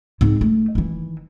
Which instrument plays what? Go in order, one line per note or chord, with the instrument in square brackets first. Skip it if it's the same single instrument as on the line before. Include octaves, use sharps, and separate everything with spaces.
[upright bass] G#2 C4
A3
D#3 E3